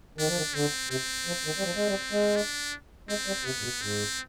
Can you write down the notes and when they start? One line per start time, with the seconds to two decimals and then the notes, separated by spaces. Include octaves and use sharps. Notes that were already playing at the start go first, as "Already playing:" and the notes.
0.18 D#3 D4
0.28 F3
0.37 D#3
0.54 D3 C4
0.90 C3 C4
1.27 F3
1.45 D#3
1.59 G3
1.64 F3
1.76 G#3
1.88 G3
2.12 G#3
2.36 D4
3.09 G#3 C4
3.27 G3
3.45 C3 B3
3.59 G#2
3.63 B2
3.82 G#2 C4